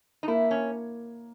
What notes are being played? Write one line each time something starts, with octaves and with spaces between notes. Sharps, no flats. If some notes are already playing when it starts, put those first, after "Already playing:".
D#4
A#3 E4
C#4